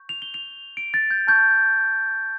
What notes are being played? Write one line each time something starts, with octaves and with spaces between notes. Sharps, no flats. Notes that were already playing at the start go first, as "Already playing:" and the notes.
Already playing: C#6 G6
F7
G7
F7
D7
A6
G6
A5 C#6 F6 G6